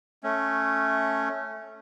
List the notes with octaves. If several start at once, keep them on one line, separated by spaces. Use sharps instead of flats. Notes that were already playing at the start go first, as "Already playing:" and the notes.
A3 C#4